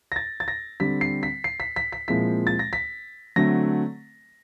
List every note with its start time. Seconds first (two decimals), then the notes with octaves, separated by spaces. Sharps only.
0.12 A#6
0.16 A6
0.40 A6
0.48 A#6
0.80 D3 G3 C4 B6
1.01 C7
1.23 B6
1.44 C7
1.60 B6
1.76 B6
1.92 B6
2.08 A#2 F3 G#3 C4 E4 B6
2.47 A6
2.59 A#6
2.73 B6
3.36 D3 F#3 A3 C4 A#6